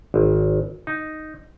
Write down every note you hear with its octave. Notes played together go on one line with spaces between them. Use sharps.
G#1
D#4